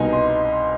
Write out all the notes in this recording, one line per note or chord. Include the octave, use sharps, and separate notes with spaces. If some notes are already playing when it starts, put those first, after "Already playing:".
Already playing: C2 B2 B3 D#4 G#5
C6